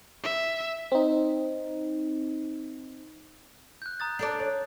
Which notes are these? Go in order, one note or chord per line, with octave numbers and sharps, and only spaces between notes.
E5
C4 D#4
F#6 G6
A#5 D#6 A6
D4 A4 D5
C#5